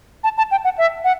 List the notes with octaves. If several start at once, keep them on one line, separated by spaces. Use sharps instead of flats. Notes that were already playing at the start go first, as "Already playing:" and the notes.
A5
A5
G5
F#5
E5
F#5